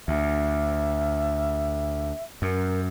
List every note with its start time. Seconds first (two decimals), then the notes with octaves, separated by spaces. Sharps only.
0.08 D2 E5
2.42 F#2 A#4